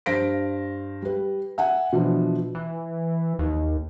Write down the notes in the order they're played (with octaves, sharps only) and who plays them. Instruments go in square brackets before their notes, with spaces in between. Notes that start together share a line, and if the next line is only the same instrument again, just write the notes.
[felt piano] G2 C5 F5 A#6 B6 D7
G3 B4
E5 F#5 G#5
B2 E3 F3 D4
[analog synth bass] E3
D#2